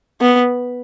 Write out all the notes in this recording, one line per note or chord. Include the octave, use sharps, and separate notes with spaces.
B3